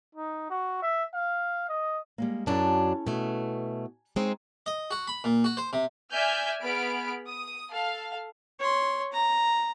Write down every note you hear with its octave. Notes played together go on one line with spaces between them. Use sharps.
D#4
F#4
E5
F5
D#5
G3 G#3 A#3
F#2 F#3 C#4 D4 E4 G#4 A5
B2 A3 G#5
G#3 C4 D#4 C#5
D#5
F#4
B5
A#2
F#4
C5
C3
D5 E5 G#5 F6 G6
B3 G#4 B5 F6 D7
D#6
A4 F5
C#5 C6
A#5